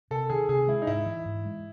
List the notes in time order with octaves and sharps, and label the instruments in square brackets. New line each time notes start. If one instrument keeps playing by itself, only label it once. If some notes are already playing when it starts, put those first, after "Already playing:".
[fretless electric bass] C3 [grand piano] A4
[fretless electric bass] D#3 [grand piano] G#4
[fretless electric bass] C3 [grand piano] G#4
[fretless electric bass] G#3 [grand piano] E4
[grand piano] D#4
[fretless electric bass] G#2 [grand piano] E4
[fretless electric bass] E3
G#2
G#3